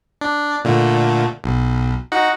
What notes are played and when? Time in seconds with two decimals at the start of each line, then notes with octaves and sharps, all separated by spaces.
0.21 D4
0.65 A#2 D3 A3
1.44 B1
2.12 D#4 F#4 F#5